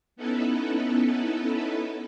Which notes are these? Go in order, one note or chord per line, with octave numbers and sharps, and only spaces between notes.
B3 C#4 D#4 E4 A4 B4